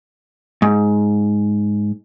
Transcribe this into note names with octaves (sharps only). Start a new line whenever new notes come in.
G#2